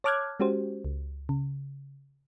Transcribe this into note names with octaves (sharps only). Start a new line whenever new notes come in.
C#5 A5 D6 F6 F#6 G#6
G#3 C#4 F#4 G4 C5
C#2
C#3